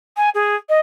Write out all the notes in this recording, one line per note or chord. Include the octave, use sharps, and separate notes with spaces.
G#5
G#4
D#5